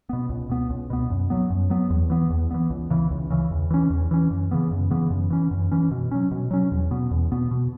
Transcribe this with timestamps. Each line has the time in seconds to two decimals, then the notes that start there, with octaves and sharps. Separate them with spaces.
0.09 B2 B3
0.29 C#2
0.49 B2 B3
0.70 C#2
0.90 B2 B3
1.10 F#2
1.30 F#3 B3
1.50 F#2
1.70 F#3 B3
1.90 E2
2.10 E3 B3
2.30 E2
2.51 E3 B3
2.70 C#2
2.90 C#3 E3
3.11 C#2
3.30 C#3 E3
3.51 E2
3.70 E3 C#4
3.90 E2
4.11 E3 C#4
4.31 F#2
4.51 C#3 E3 B3
4.71 F#2
4.90 C#3 E3 B3
5.10 F#2
5.30 E3 C#4
5.51 F#2
5.72 E3 C#4
5.91 B2
6.11 F#3 C#4
6.31 B2
6.51 F#3 C#4
6.72 E2
6.91 B2 B3
7.11 E2
7.32 B2 B3
7.51 B2